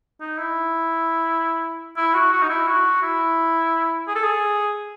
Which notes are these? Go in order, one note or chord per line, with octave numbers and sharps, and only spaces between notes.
D#4
E4
E4
F#4
F#4
D#4
E4
F#4
E4
G#4
A4
G#4